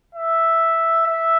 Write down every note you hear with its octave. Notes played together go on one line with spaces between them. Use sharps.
E5
E5